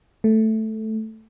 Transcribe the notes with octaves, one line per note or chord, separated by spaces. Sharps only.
A3